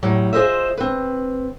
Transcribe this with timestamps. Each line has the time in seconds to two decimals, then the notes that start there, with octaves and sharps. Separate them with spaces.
0.03 A2 F#3 G3
0.33 F4 G#4 A#4 C5 D#5 E5
0.77 C4 B4